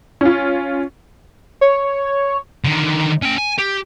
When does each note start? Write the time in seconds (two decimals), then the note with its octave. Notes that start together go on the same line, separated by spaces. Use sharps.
0.21 C#4 F4
1.61 C#5
2.64 D3 D#3
3.22 C#4 G5
3.38 G#5
3.59 G4